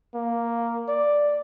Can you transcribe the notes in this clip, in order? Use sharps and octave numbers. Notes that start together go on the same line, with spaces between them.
A#3
D5